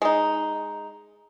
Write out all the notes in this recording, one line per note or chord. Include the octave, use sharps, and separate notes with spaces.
G#3 D#4